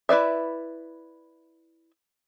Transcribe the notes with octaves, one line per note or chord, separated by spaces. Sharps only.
E4 B4 D5 E5